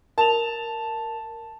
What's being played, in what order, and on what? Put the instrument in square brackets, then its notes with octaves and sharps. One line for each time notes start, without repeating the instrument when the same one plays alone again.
[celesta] A#4 F7 [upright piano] A5